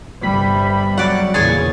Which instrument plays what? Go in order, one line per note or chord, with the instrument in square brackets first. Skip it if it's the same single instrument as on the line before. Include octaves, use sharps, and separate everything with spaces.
[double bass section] G1 C3 G3 [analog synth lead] B5
[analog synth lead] F#3 [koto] D5 F#5
[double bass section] E2 A#2 C#3 [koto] G#4 C#5 G#5 [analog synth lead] A6